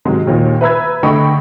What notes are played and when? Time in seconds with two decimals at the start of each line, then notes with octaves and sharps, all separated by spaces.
0.05 G#2 C3 D#3 F#3 G#3
0.27 D#2 A#2 D#3
0.61 B4 E5 A#5 B5 E6 G#6
1.03 D3 A3 D#5 G5 B5 C#6